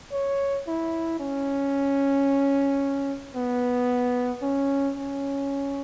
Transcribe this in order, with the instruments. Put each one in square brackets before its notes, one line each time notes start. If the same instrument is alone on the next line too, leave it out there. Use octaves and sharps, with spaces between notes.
[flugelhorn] C#5
E4
C#4
B3
C#4
C#4